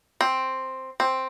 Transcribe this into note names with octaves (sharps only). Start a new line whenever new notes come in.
C4
C4